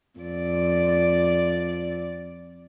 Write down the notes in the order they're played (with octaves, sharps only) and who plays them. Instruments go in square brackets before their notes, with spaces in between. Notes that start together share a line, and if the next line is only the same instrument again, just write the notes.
[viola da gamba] F2 D5